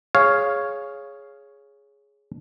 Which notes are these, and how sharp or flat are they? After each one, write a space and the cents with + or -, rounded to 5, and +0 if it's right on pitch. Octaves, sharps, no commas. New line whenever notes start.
G#4 +5 C#5 +0 F5 +0